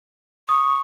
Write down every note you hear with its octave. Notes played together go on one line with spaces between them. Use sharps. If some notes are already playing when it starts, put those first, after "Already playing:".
C#6 D#6